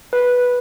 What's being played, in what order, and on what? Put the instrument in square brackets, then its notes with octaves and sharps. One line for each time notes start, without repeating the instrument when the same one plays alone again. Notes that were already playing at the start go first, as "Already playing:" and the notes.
[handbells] B4